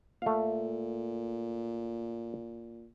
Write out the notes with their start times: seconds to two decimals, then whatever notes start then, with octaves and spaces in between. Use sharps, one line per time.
0.22 A#2 A3 F5